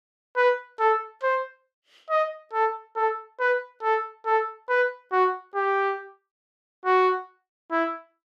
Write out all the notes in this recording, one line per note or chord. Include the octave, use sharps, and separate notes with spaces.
B4
A4
C5
D#5
A4
A4
B4
A4
A4
B4
F#4
G4
F#4
E4